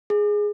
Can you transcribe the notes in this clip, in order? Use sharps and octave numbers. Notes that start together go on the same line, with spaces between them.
G#4